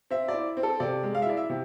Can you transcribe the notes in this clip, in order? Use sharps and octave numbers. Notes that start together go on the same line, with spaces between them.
C4 E5
D5
E4
C4
A4
C3 D5
G#3
F5
E5
E4 D5
E5
C3